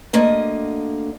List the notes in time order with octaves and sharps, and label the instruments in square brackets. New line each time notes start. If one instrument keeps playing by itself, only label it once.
[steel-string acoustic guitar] D2 D3 A#3 D#5